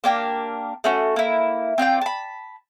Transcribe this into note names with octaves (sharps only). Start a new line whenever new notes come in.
A#3 D4 G4 A#4
A3 C#4 F#4
A#3 E4
C4 F4 D5 G5
A5 B5